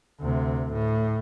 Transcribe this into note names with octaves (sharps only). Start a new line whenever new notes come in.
D2 C3
A2